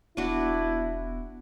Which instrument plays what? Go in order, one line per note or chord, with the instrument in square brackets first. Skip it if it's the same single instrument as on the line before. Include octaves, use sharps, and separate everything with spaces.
[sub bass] E1 [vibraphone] B3 [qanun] D4 F#4 [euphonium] E4